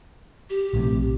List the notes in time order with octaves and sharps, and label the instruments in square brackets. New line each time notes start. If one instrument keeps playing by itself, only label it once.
[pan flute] G4
[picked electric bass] A#1 A2 C3